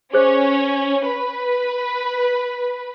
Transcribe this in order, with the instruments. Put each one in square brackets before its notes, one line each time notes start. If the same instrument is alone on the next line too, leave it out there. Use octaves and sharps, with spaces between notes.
[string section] C#4 [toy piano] G#4 C5 D#5
[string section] B4